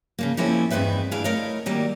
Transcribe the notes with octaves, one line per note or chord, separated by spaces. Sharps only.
C#3 F3 A#3
F3 G#3 A#3 C4 C#4 E4
E2 G2 C4 D#4 B4 E5
D2 D4 E4 G#4 F5
A3 E4 A#4 C#5 D#5 F5
D#3 F#3 G3 A#3